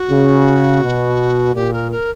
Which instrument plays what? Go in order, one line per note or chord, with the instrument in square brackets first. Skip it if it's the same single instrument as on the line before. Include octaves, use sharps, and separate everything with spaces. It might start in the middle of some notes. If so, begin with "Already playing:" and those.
Already playing: [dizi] F#4
[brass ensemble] C#3
B2
[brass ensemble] A#2 [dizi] G4
[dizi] A#4
A#4